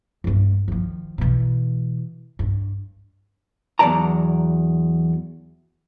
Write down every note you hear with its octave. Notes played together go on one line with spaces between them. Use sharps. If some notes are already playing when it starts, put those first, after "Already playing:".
G2 A3
D#3 F3
B2 E3
G2
E2 G#2 F#3 D5 A5 A#5